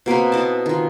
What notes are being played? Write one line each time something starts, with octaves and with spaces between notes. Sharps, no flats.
B2 A#3 C4 B4
E4 D#5 A5
D#3 F4